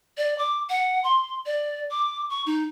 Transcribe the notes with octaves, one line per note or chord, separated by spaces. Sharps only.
D5
D6
F#5
C6
D5
D6
C#6
D#4